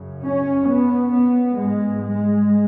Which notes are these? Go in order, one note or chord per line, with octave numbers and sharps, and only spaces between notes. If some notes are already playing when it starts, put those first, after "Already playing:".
Already playing: F#2 C#3
C#4
B3
B3
G#2 G#3
G#3